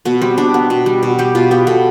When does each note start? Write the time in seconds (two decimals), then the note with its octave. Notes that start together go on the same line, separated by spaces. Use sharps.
0.05 B2 B3
0.21 G3 C4
0.38 B2 D4
0.54 B3
0.70 B2
0.86 G3
1.03 B2
1.19 G3 G4
1.35 B2 F4
1.51 B3 G4
1.67 B2 A4